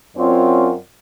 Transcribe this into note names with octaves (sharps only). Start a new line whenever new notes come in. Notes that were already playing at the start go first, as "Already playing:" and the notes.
F#2 C4 C#4 F4 C#5 D5